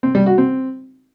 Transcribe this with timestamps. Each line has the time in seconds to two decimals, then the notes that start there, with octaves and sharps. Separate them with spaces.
0.03 C4
0.15 G3
0.26 F#4
0.38 C4